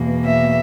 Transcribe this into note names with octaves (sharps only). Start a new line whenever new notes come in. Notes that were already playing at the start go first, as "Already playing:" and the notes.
Already playing: E2 B2 A#3
E5